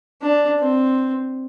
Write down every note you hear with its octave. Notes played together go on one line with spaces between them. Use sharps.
D4
C4